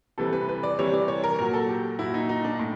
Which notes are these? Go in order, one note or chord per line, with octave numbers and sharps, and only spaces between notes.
C3 E3 G3 A4
B4
B4
D5
C3 E3 G3 C#5
D5
C#5
A#4
A#2 F#3 A#4
A4
G4
A#2 F#3 E4
D#4
D#4
D4
A2